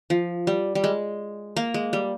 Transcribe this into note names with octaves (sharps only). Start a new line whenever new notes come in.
F3
G3
G3
G#3
A#3
G#3
G3